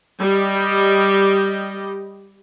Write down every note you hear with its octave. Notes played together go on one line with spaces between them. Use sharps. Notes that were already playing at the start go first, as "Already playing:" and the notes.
G3 G4 D#5